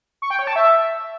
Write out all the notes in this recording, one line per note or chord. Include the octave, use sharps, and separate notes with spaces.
C#6
G5
C#5
A5
E5